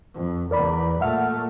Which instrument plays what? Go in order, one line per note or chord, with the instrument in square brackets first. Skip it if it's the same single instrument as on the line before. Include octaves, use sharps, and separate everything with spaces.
[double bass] F2
[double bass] E2 [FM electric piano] A#4 D5 B5
[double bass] A#2 A3 [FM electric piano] E5 F#5 F6